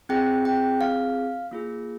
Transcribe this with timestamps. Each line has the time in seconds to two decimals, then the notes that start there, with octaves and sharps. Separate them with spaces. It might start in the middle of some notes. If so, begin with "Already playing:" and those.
0.09 C4 F4 G#4 G5
0.45 G5
0.81 F5
1.51 A#3 F4 G#4